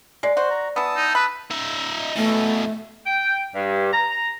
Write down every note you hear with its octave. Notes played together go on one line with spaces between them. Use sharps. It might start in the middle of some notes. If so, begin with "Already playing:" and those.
G#3 D5
F#4 C5
A#5
E3 B3 A5 D#6 E6
D#4
B4 B5
D#4 E5
B2 E3 A3
G5
G2
A#5